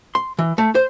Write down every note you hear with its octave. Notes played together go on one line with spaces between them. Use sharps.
C6
E3
A3
C5